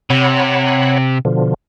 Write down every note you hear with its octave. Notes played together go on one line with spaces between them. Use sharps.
C3 C#5 F#5 B5
B2 D3 F3